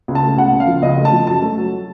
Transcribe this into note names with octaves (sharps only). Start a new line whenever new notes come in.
C#2
A5
A3
C#2 F#5
C#2
F5
F3
C#2 D#5
A3
A5
F3
F#2 A5
A3
F#3